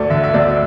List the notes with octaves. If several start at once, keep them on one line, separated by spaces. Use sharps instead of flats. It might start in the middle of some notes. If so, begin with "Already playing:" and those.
Already playing: D2 A3 D5
D3 E5
E5
D2 D5